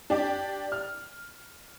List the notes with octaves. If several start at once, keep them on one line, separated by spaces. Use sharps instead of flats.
D4 G4 D5
F6